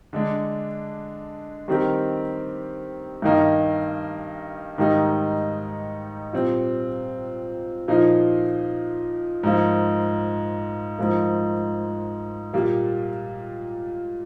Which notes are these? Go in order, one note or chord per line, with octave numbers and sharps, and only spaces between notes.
D3 G#3 D4
D#3 G3 C4 G4 A#4
G2 D#3 A#3 D#4
G#2 D#3 G3 A#3 D#4
A#2 G3 C4
A#2 F3 A#3 D#4
G#2 F3 A#3
G#2 F3 A#3
A#2 G3 A#3